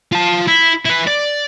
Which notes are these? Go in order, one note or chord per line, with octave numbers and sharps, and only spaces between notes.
F4 A5
E4
E4 B4
D5